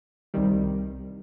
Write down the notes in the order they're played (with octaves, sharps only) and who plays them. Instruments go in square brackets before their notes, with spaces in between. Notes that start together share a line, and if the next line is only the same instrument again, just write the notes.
[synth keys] C2 C3 D#3 G3